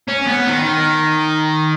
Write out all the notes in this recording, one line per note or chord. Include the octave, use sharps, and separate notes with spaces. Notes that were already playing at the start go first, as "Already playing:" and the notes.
C#4
B3
D#3